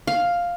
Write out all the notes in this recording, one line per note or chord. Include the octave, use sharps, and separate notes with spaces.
F5